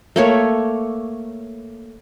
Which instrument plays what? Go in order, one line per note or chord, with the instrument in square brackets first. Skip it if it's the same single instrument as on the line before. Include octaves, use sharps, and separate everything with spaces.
[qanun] A3 A#3 C#5